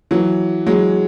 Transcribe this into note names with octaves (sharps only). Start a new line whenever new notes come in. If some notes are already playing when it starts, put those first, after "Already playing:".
E3 F#3
F#3 G#3